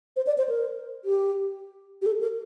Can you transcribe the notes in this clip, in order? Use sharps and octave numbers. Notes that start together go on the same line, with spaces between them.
C5
D5
C5
A#4
G4
G4
A4
A#4